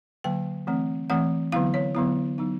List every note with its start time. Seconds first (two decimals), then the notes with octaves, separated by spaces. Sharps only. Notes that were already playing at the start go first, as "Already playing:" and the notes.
0.24 D3 F#3 A#3 G5
0.67 E3 A3 C4
1.10 E3 A3 C4 F#5
1.52 D3 F#3 B3 E4 F5
1.74 C#5
1.95 D3 F#3 B3 E4
2.38 F#3 B3 D#4